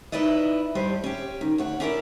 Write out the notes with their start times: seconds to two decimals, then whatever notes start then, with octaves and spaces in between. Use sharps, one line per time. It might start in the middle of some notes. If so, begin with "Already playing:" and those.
0.12 D#4 E4 B4 D5 D#5
0.75 G2 G3 C5 D#5
1.04 C#4 G4
1.41 D#3
1.58 D2 C#5 F#5
1.80 C#4 D4 E4 A#4 C#5 D5